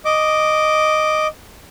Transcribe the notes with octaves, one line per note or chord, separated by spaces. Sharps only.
D#5 D6